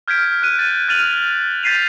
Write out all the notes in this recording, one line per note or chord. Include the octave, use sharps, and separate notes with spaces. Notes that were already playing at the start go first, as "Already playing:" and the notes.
F6 G6 G#6 B6 D7
F#6 D#7
A6 D#7
F6 A6 D#7 F7 F#7
G6 A6 B6 C7 D#7 F7